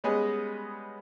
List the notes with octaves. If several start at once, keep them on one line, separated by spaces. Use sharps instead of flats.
G3 G#3 B3 C#4 G#4 D#5